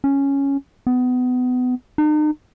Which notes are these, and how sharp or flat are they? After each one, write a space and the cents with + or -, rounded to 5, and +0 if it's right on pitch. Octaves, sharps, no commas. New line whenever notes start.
C#4 +0
B3 +25
D#4 -40